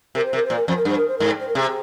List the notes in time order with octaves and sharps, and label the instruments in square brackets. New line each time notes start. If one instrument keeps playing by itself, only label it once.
[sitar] C3 [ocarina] A#4
[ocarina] C5
[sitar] C3 [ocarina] A#4
[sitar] A#2 [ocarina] C5
[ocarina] A#4
[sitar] F2 [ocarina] C5
[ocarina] A#4
[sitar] G2 [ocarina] C5
[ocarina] A#4
C5
[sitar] G#2 [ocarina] A#4
[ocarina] C5
A#4
[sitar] C3 [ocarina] G#4